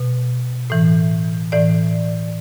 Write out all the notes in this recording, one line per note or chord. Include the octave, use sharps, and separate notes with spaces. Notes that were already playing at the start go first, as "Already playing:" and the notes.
Already playing: B2
A2 E3
A2 E3 D5